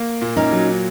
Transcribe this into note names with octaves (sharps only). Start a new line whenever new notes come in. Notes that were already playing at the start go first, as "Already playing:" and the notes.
Already playing: A#3
A#2
C#4 D#4
F#3